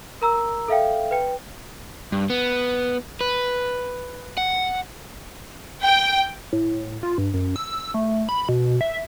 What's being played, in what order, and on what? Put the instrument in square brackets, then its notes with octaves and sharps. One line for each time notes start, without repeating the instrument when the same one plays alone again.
[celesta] A#4 A#5 E6
A4 E5 F5 G5
B4 G5
[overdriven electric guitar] G2
B3
B4
F#5
[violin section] G5
[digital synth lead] A2
F4
G2
F#2
E6
A3
B5
B2
E5